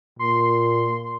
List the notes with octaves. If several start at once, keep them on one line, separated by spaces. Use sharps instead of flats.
A#2 C6